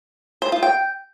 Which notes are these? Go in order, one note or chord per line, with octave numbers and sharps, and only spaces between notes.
C5
F4
G5